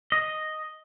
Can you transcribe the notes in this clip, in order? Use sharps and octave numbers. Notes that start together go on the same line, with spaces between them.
D#5